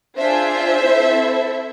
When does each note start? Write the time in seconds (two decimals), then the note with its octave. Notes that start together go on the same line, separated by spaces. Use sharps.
0.18 D4 F4 G#4 C5 E5
0.82 C4 E4 A4